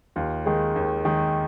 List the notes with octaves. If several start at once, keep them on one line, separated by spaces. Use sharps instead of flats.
D#2 F4
D#3 G#3
D#2
D#3 G#3